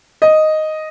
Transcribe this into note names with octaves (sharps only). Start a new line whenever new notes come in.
D#5